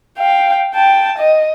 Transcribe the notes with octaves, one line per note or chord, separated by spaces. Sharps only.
F5 G5
G5 A5
D#5